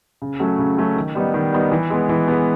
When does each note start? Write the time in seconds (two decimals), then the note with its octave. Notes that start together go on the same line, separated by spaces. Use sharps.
0.22 C#3
0.40 F#3 A3 C#4
0.59 C#3
0.78 F#3 A3 C#4
0.96 D#3
1.15 G3 B3 D#4
1.34 D#3
1.52 G3 B3 D#4
1.72 E3
1.90 G#3 B3
2.09 E3
2.28 G#3 B3